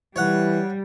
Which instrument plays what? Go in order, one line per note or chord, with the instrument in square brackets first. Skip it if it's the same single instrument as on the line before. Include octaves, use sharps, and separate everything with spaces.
[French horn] E3 [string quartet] G3 [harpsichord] C#5 F#5